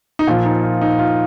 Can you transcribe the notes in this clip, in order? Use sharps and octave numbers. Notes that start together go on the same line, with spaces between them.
D#4
A#2 F3 F4
D#4
F4
D#4
F4